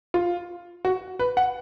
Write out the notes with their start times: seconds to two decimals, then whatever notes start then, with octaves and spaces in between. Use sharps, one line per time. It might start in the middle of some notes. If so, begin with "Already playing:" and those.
0.14 F4
0.85 F#4
1.19 B4
1.37 F#5